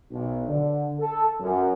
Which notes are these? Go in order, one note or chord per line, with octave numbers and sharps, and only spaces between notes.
B1
D3
A4
F#2